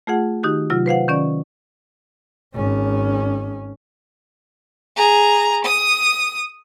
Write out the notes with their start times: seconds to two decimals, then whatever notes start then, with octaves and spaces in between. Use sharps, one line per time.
0.07 A3 F4 G#4 F#5
0.43 D#3 D#4 F#4 G4
0.70 C3 F#3 F4 F6
0.86 B4 C5 F5 F#5
1.08 D#3 C#4 D5
2.54 G#1 C#4
4.96 G#4 A#5
5.65 D#6